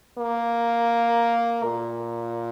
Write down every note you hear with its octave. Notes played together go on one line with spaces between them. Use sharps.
A#3
A#2